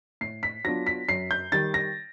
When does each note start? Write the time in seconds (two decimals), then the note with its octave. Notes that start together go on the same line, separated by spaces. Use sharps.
0.21 A2 C7
0.43 B6
0.64 F#3 B3 D4 F4 A#6
0.87 B6
1.09 F#2 C7
1.31 G6
1.52 D#3 G3 A6
1.74 A#6